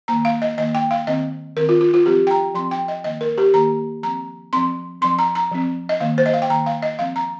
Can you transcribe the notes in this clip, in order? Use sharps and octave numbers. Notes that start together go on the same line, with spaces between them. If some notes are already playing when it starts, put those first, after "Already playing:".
D#3 A#3 A#5
F5
D#5
D#3 A#3 D#5
G5
F5
D#3 C4 D#5
D#3 C4 A#4
F4
F4
F4
F3 C4 G4
G5
A#5
F3 C4 C6
G5
D#5
D#3 A#3 D#5
A#4
G4
D#3 A#3 A#5
F3 C4 A#5
F3 C4 C6
F3 C4 C6
A#5
A#5
F3 C4
D#5
D#3 A#3 F5
C5
D#5
F5
G5
D#3 A#3 A#5
F5
D#5
F3 C4 F5
A#5